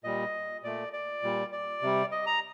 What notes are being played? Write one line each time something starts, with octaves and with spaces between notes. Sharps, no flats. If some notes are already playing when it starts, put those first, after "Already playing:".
A#2 G3 D#5
A#2 A3 D5
D5
A#2 G3
D5
C3 G3
D#5
A#5